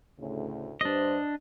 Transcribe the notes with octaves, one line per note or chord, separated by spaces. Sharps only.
D2 A2 C#3
G2 D4 C5 D#5